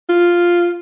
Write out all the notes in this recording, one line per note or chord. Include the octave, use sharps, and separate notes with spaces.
F4